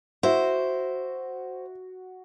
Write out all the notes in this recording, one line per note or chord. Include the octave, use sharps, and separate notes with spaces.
E4 F#4 C5